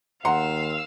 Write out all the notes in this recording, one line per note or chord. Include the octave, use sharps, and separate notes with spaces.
D#2 F5 F#5 A#5 C6 E6